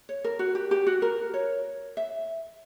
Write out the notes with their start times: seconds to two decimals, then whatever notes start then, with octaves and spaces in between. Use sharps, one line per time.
0.09 C#5
0.24 A#4
0.39 F#4
0.55 G4
0.71 G4
0.87 F#4
1.02 A#4
1.34 C#5
1.97 E5